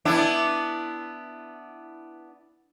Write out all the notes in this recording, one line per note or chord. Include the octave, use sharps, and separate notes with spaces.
B3 D4 E4